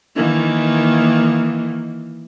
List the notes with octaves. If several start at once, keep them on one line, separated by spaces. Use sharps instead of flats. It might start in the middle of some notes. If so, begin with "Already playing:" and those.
D#3 E3 A#3